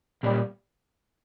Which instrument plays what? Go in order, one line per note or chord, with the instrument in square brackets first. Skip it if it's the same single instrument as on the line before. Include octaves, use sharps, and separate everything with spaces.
[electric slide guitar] A#2 A#3 C#4 [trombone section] G3